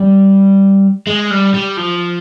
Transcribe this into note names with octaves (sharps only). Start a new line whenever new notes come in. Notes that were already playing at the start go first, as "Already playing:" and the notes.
Already playing: G3
G#3
G3
G3
F3